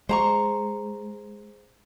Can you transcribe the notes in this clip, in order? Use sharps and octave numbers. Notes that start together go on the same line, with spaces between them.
G#3 C5 A#5 C#6